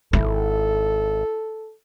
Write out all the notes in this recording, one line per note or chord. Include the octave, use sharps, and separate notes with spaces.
G#1 E4 A4